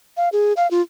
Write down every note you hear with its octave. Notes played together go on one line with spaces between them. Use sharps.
F5
G#4
F5
F4